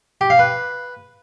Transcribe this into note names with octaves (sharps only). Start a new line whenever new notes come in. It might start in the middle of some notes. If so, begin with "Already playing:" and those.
G4
F5
B4